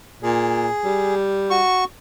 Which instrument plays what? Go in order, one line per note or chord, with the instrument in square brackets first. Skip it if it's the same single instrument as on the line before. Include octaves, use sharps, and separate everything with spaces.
[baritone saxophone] A#2 [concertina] G#4
[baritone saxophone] G3
[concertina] F#4 C#6